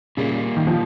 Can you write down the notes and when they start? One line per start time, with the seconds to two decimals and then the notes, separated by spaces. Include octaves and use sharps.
0.17 A#2 C#3 G3 A#3
0.57 D#3
0.67 F3